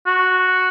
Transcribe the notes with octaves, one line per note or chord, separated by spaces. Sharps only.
F#4